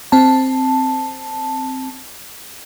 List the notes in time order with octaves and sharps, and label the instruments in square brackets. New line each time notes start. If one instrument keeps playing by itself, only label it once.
[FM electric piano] C4 A5